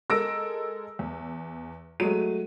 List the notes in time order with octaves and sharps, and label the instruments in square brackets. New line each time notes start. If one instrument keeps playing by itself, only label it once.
[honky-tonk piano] G#3 A4 A#4 [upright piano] E6 A#6 D7
[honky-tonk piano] E2
[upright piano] F#3 G#3 A3 [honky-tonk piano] D#7